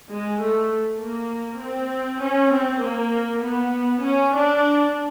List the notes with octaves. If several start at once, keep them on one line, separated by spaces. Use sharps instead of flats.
G#3
A3
A#3
C4
C#4
C4
A#3
B3
C#4
D4